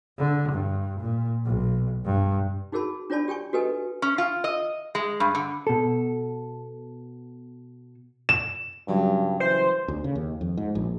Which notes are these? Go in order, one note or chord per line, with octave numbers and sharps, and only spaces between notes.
D3
G2
A#2
B1
G2
D#4 F#4 G#4 A#4 A5 B5
D4 F4 C#5 D5 A5 B5
G4 G5 G#5 C#6
F#4 G4 A4 B4 D#5 G#5
C#4
F4
D#5
G#3
G2
D3
B2 A4
E7
G2 C#3 F#3 G3
E3 C5
D2
C#3
D#2
F2
G#2
A#1